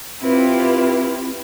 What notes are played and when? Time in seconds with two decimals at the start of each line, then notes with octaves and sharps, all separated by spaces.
0.21 C4 E4 F4 G4 B4